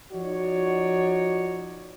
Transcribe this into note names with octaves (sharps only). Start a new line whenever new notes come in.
F3 D#4 F#4 C#5 D5